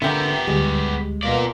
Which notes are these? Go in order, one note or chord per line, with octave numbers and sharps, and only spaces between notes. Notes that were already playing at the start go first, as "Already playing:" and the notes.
D3 A#3 B3 G4 E5 G5 A#5
D2 G3 G#3
B2 A#3 F4 A#4 D5